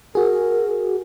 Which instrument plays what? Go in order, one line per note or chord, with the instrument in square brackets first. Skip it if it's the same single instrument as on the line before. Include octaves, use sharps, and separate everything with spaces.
[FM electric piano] F#4 G#4 [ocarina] A#4